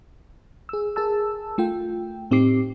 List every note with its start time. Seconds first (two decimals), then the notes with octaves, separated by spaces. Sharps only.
0.69 G#4 E6
0.96 G#4 A#4 A5 E6
1.58 A3 F4 G5
2.31 A2 C4 D#4 G4 D6 C7